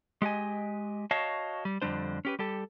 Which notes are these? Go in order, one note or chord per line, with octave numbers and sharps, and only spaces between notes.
G#3 G4 D#5 G#5
F#4 C#5 D#5 F5 A5
G3
F2 D3 G3 D4 C5
C#4 G4 B4
G3 G4 A4